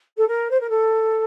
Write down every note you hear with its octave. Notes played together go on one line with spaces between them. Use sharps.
A4
A#4
C5
A#4
A4